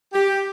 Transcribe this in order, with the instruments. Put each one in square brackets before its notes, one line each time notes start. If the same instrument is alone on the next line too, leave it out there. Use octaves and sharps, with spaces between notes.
[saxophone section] G4